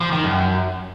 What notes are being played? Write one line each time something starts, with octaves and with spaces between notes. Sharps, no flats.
F3
D#3
F#2